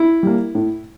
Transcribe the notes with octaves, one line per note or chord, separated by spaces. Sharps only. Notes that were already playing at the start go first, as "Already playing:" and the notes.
Already playing: E4
G3 A#3
A2